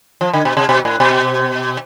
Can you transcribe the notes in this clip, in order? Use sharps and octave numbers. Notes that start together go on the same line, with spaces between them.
F3
D3
B2
C3
B2
A2
B2